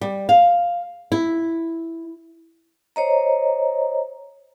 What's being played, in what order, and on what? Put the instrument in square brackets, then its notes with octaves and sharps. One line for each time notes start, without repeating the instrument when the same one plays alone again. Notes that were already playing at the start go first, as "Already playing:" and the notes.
[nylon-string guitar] G3
F5
E4
[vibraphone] C5 C#5 D#5 A#5